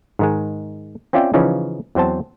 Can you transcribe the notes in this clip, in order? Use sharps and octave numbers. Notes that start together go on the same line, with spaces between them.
G#2 D#3 G#3
C4 C#4 F4 D5 E5 G5
C#3 E3 F3 C#4 D#4
E2 F#3 C4 C5 A5